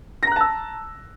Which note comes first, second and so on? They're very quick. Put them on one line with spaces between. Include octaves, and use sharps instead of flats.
A#6 A#5 F#6 A5 E6